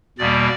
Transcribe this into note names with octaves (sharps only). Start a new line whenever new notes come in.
E2 B2 G3 A#3 D5